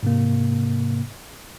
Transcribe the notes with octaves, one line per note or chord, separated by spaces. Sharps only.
G#2 C3 A#3